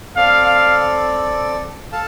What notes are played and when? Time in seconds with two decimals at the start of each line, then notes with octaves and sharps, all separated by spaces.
0.16 C4 A4 D5 F5
0.46 F5
1.92 A4 F5 A5